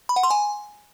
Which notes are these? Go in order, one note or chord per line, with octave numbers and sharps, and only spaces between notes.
B5
F#5
C6
G#5